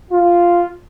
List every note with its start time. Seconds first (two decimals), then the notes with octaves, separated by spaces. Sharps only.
0.11 F4